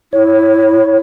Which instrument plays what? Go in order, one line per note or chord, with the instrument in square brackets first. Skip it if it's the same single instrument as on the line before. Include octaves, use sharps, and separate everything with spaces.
[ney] E4 [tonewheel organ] C#5